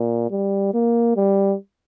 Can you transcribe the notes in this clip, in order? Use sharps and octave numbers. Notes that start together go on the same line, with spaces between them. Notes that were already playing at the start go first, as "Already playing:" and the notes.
Already playing: A#2
G3
A#3
G3